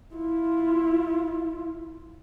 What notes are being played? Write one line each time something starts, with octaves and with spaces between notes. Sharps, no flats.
E4 F4